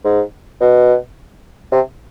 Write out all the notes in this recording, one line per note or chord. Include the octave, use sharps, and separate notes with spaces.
G#2
B2
C3